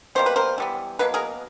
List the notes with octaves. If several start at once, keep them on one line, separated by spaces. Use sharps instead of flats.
B2 G3 A#3 C5
B4
A#4 C5
E3 G3 B3
B2 F#3 A#3 B4
G#4 A#4